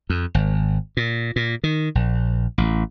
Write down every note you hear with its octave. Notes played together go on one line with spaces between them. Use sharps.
F2
G#1
A#2
A#2
D#3
A#1
A1